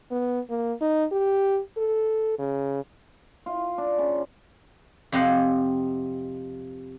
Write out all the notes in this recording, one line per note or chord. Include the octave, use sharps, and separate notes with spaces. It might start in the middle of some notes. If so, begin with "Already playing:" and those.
B3
A#3
D#4
G4
A4
C#3
F4
D4
C#3
F2 C3 G4 D#5 F#5 C6